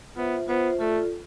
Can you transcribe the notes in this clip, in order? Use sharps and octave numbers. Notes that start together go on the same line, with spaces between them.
B3 F4 C5 E5
B3 F4 C5 E5
A3 F4 A4 D5